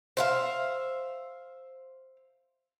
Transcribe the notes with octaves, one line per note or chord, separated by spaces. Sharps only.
C5 E5 F5